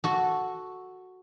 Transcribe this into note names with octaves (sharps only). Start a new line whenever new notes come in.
F#4 A4